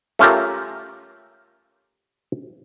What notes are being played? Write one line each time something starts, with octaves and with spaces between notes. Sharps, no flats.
A3 C#4 F4 G4 A#4